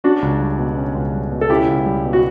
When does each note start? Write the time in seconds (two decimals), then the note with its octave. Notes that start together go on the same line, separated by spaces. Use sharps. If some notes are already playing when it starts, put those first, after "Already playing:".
0.04 C#4 D4 F#4
0.22 C#2
0.40 G3
0.59 B2
0.77 C#4
0.95 C#2
1.13 G3
1.32 B2
1.41 A4
1.50 C#4 E4 G4
1.68 C#2
1.86 G3
2.05 B2
2.13 F#4